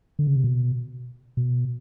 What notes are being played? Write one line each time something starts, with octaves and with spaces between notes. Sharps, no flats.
D3
C#3
C3
B2
B2